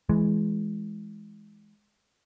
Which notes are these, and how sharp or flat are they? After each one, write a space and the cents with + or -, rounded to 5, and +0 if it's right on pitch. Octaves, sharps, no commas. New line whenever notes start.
E3 +0 G#3 +10